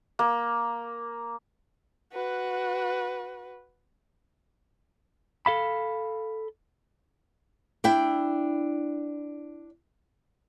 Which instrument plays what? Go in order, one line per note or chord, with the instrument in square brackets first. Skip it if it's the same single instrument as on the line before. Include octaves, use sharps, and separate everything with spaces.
[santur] A#3
[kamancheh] F#4 B4
[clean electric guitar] A4 F5 B5
[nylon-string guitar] D4 E4 G5